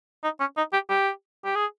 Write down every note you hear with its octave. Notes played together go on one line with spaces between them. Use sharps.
D#4
C#4
D#4
G4
G4
G4
G#4